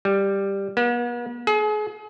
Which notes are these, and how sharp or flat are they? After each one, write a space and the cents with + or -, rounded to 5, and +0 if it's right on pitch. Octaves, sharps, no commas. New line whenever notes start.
G3 +10
B3 -45
G#4 +35